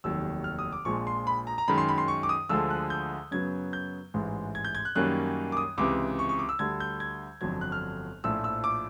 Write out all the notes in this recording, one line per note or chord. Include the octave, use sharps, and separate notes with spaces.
F1 D#2 D#3 F#3 E6
F6
D#6
D6
A#1 A#2 F3 G#3 C#6
C6
B5
A#5
A#5
F#2 D#3 G#3 B5
C6
B5
C6
C#6
D6
D#6
D2 D3 F3 G#3 E6
F#6
G6
F#2 C#3 F#3 B3 G#6
G6
A1 G#2 E3 G#3
G#6
G6
G#6
F#6
F#2 D#3 G3 A#3 C#4 F#6
D6
D#6
C#2 C3 E3 D6
C#6
C#6
D6
E6
D2 D3 G3 G#6
G6
G#6
G1 F2 D3 F#3 G#6
F#6
F6
A#1 A2 F3 E6
E6
D6